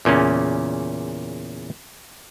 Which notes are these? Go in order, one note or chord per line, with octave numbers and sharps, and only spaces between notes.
E2 A#2 C#3 C#4